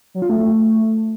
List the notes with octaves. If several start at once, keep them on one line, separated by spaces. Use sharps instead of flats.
F#3
F4
A3